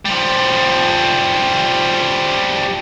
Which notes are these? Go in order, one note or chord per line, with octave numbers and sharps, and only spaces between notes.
F3 G3